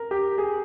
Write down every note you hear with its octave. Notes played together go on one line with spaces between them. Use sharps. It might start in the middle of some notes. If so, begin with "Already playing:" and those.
Already playing: A#4
G4
G#4